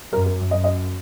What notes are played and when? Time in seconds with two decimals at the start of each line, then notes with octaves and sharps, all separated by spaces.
0.13 F#2 A#4
0.26 A#4
0.51 F#2 D#5
0.64 D#5